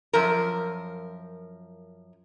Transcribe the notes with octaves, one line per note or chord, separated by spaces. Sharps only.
F#2 F3 A#4